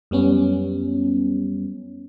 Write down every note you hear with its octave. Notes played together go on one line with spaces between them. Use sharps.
F#2 G3 B3 C#4